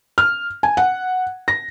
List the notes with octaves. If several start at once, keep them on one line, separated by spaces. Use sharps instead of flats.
F6
G#5
F#5
A#6